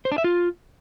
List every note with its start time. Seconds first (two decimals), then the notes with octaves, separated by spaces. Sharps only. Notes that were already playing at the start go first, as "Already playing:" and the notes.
0.05 C5
0.12 D4
0.18 E5
0.24 F4